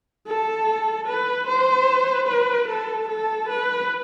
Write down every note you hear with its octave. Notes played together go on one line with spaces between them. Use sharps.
A4
B4
C5
B4
A4
A4
B4